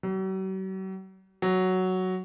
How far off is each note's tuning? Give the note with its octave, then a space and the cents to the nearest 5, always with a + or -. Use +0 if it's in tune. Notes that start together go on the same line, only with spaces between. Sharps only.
F#3 +45
F#3 +5